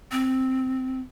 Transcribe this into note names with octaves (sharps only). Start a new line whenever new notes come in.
C4